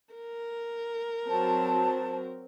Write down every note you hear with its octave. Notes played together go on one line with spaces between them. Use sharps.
A#4
F#3 C4 A5